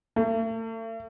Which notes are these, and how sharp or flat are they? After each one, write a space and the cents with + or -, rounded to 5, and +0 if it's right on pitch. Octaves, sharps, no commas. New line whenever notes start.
A3 +40